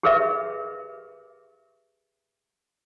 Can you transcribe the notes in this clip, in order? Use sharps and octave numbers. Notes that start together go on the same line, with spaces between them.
G4 G#4 A#4 B4 D#5 E5